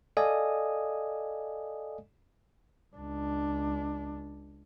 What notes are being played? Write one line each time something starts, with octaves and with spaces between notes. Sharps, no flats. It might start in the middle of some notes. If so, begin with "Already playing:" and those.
A4 D5 D#5 F5 G#5 D#6
C#2 D4